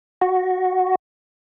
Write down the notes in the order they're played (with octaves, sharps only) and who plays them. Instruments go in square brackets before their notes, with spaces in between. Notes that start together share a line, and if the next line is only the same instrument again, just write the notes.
[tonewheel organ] F#4